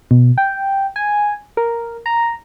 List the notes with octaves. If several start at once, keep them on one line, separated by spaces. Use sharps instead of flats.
B2
G5
G#5
A#4
A#5